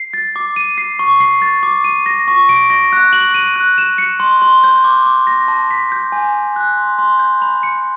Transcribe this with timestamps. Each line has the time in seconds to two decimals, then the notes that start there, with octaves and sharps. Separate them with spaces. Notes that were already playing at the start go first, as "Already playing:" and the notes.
Already playing: C7
0.13 A6
0.36 D6
0.56 D#7
0.78 C7
0.99 C#6
1.20 C7
1.42 A6
1.63 D6
1.84 D#7
2.06 A#6
2.28 C#6
2.49 D7
2.70 A#6
2.93 F#6
3.13 F#7
3.34 D#7
3.56 F#6
3.78 E7
3.98 C#7
4.20 C6
4.42 C6
4.64 G6
4.84 D6
5.06 D6
5.27 A#6
5.48 A5
5.71 B6
5.92 G6
6.12 G#5
6.34 G#5
6.56 F#6
6.77 C6
6.99 C6
7.19 G6
7.42 B5
7.63 C#7